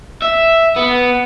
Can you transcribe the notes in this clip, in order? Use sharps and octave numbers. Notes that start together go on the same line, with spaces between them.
E5
B3